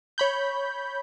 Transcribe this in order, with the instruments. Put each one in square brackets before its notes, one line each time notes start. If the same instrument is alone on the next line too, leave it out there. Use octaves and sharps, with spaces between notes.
[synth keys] C#5 B5 G6